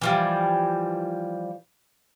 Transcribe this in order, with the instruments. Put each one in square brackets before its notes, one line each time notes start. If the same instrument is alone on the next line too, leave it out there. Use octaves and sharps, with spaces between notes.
[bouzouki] E3 F3 G3